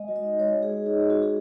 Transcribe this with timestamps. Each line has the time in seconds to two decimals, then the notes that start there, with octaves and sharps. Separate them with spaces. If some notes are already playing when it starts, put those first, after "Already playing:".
Already playing: G#3 D#5
0.08 F#4
0.16 D#5
0.24 D#4
0.39 G#3 C#5
0.55 G#3
0.63 G#4
0.71 F#4
0.86 D#4 G#4
1.02 G#3
1.10 F#4
1.18 G#3 G#4